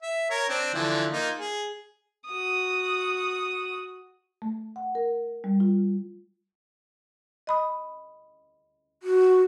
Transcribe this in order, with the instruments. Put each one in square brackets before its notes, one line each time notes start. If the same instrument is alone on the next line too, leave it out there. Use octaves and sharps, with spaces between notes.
[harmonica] E5
A#4 C#5
C4 D4
D3 E3 F3
A#3 D#4 F4
G#4
[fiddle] F#4 D#6
[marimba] A3
F#5
A#4
G3
F4
D#5 B5 D#6
[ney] F#4